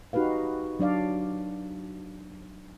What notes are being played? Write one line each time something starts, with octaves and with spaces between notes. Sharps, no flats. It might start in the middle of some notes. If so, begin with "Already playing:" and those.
D#4 F#4 G4 B4 F5
F#3 D4 D5 F5